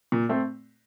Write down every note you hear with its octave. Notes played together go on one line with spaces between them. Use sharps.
A#2
A3 C4